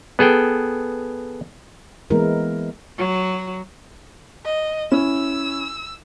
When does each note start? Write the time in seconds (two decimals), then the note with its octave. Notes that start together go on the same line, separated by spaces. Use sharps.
0.19 B3 G#4 A4 G5
2.10 E3 G#3 A#3 B3 E4 A#4
2.98 F#3
4.45 D#5
4.92 C#4 E4 E6